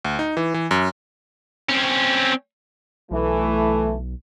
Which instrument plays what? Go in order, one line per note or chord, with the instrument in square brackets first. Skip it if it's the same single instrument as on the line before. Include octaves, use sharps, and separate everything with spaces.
[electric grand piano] D2
D#4
E3
E3
F#2
[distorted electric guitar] C4 C#4
[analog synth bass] B1 [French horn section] E3 A3